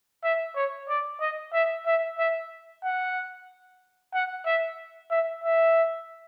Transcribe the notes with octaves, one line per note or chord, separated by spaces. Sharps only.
E5
C#5
D5
D#5
E5
E5
E5
F#5
F#5
E5
E5
E5